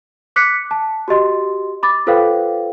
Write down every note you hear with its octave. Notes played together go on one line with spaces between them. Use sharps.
D6 F#6 B6 C#7
A5
F#4 G4 D#5 C6
B5 D6 A6
F4 A4 B4 C5 F5 G5